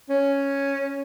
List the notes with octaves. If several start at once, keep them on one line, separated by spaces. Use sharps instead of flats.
C#4